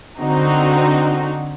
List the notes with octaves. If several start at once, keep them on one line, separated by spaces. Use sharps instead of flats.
D3 C4 D#4 F#4